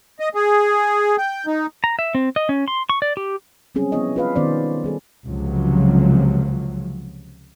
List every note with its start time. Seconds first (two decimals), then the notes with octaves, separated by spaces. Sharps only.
0.20 D#5
0.35 G#4
1.18 G5
1.46 D#4
1.84 A#5
1.99 E5
2.15 C4
2.36 D#5
2.49 C#4
2.68 C6
2.90 C#6
3.02 D5
3.17 G4
3.75 F#3 G3 C4 C#4 G#4
3.92 F3 B3 E4 C#5 D#5
4.16 F4 B4 F5
4.35 D#3 G#3 B3 C#4 C5 D5
4.84 G3 G#4 A4
5.25 C#2 C3 F3 F#3